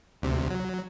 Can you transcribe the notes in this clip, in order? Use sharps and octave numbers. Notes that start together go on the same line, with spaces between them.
D2 C3
F#3